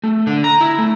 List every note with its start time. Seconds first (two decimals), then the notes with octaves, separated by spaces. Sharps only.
0.04 A3
0.27 D3
0.44 A#5
0.61 E4
0.78 A3